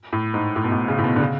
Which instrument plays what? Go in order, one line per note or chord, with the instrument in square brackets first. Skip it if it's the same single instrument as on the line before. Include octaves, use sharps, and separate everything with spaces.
[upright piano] A2
G#2
A2
B2
A2
C#3
A2
B2
D3
C#3